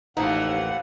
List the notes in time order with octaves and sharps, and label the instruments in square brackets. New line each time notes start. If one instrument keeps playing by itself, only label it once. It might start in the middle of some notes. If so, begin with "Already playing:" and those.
[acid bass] A1 [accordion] D#2 A2 F#5 [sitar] E3 F3 A#3 [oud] D#4